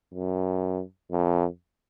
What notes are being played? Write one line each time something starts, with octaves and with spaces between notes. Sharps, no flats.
F#2
F2